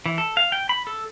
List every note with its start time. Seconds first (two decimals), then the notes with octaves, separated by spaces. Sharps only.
0.06 E3
0.18 A4
0.37 F5
0.52 G5
0.69 B5
0.87 A4